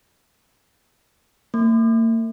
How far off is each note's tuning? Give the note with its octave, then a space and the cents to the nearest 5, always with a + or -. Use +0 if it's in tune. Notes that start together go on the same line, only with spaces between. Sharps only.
A#3 -40